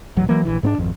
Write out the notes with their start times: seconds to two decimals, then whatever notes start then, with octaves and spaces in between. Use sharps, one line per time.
0.16 D#1 A1 F#3
0.29 E3 F#3 A#3
0.45 A#1 E3
0.63 G#2 B3 D4
0.78 G#1 F2